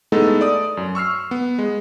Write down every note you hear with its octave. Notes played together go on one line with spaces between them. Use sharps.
G#3 A3 B3 D#4 E4 A4
D5 D#6
F#2
C#6 E6 F6 C7
B3
G#3